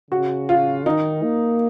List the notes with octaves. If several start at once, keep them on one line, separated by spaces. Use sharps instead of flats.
C#3 F#4
F4
D#3 D#4
A#3